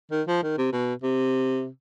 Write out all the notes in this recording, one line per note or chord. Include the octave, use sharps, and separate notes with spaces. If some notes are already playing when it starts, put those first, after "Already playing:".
D#3
F3
D#3
C3
B2
C3